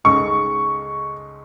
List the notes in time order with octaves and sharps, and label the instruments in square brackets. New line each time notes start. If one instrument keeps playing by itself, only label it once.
[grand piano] C#2 C#3 G#3 D#4 A4 [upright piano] C#6